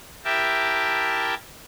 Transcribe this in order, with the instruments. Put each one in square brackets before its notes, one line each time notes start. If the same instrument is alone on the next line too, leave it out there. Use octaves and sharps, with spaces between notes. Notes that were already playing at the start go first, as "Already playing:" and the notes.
[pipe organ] E4 G4 A#4 E5 G5 A5